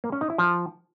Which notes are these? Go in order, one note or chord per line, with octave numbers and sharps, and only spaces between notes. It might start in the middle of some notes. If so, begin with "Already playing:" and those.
A#3
C#4
D#4
E4
F3